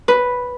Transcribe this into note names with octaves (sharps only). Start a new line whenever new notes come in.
B4